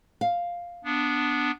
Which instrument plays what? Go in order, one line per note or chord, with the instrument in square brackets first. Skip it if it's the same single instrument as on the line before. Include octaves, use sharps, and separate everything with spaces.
[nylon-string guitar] F5
[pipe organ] B3 D4